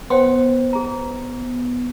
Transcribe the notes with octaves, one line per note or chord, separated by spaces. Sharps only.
B3 C5 G5 C6
G#4 A#5